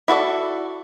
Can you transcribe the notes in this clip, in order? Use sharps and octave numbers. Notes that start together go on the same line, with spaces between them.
E4 F#4 A4 D5